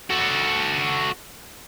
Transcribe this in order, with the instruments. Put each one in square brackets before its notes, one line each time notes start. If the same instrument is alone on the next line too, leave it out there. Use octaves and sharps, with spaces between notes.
[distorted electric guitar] F#4 A4